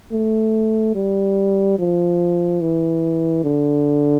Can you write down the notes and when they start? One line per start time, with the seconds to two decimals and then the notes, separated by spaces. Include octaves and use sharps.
0.13 A3
0.95 G3
1.79 F3
2.61 E3
3.44 D3